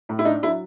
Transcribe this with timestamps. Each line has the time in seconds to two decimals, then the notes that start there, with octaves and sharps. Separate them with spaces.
0.09 A2
0.19 E4
0.25 D4 D#4
0.42 F#3 E4